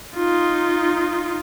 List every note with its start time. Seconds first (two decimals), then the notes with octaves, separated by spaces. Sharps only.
0.16 D#4 F4